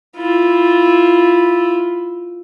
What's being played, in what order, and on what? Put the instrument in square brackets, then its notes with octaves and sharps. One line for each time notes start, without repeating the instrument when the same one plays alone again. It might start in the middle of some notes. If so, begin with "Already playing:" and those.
[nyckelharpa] E4 F4